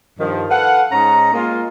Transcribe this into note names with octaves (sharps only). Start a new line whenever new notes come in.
G2 D#3 F3
A4 B4 F5 F#5
G#2 C#4 D#4 A#5
G#3 A#3 F4